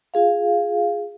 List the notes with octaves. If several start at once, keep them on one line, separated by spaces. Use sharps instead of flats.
F4 G#4 F5